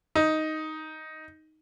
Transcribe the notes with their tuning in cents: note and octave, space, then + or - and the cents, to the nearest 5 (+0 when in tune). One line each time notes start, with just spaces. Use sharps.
D#4 +5